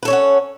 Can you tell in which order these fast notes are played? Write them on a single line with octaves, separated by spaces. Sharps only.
B4 A4 C#5 C#4 F#5